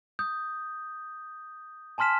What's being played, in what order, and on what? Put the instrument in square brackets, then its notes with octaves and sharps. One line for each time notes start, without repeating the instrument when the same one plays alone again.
[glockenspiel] D#6 G6
G#5 A5 C6 F6 B6 E7